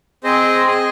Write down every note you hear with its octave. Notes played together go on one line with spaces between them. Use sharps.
C4 G#4 C5 D#5
G#4 D#5 G#5